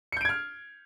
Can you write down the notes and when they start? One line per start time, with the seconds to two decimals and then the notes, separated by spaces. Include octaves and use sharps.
0.12 C#7
0.17 G6
0.21 D7
0.25 G#6
0.29 F6